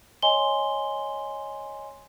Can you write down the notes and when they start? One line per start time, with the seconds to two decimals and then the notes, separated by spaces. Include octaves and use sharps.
0.22 C#5 D#5 G#5 C6 G7